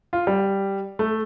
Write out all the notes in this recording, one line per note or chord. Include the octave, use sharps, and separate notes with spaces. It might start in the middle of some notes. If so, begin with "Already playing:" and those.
F4
G3
A3